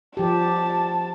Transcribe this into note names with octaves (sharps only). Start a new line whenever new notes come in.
F3 G4 A5